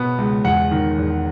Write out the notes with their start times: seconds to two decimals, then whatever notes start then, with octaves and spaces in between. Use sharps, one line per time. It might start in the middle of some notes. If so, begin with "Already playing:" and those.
Already playing: B2 B3
0.18 C#2
0.44 E2 F#5
0.71 D#3
0.98 E2